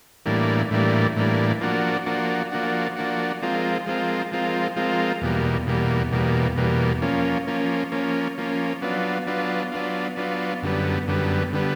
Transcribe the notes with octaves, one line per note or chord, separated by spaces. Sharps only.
A2 E3 G3 A#3 D4
A2 E3 G3 A#3 D4
A2 E3 G3 A#3 D4
F3 A#3 D4 F#4
F3 A#3 D4 F#4
F3 A#3 D4 F#4
F3 A#3 D4 F#4
F3 G#3 C4 F4 A#4
F3 G#3 C4 F4 A#4
F3 G#3 C4 F4 A#4
F3 G#3 C4 F4 A#4
E2 B2 G3 A#3
E2 B2 G3 A#3
E2 B2 G3 A#3
E2 B2 G3 A#3
F3 A#3 C#4
F3 A#3 C#4
F3 A#3 C#4
F3 A#3 C#4
F#3 B3 D4 F4
F#3 B3 D4 F4
F#3 B3 D4 F4
F#3 B3 D4 F4
F#2 D3 G3 B3
F#2 D3 G3 B3
D3 G3 B3